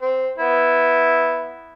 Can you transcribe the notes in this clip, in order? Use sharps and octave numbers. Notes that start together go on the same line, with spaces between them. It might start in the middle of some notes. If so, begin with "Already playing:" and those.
C4
B3 E4